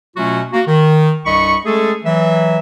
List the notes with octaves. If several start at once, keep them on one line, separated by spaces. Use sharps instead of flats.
B2 F#3 A3 C#4 F4 F#4
A#3 F#4
D#3
C2 G2 D#5 B5 C#6
G#3 A3 C#4 G#4 A4
E3 F#3 E5